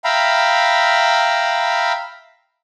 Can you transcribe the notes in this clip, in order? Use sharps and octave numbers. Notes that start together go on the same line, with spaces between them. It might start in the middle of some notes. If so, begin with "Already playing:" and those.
E5 F5 G5 A#5 B5